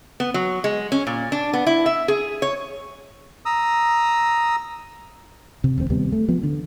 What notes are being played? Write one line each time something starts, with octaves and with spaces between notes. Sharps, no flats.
B3
F#3
G#3
C#4
A#2
D4
B3
E4
E5
G#4
C#5
A#5 D#6 E6
C3
E1 D#2 G#3 C4
D#2 C3 G3 B3
A3
F3 B3
D3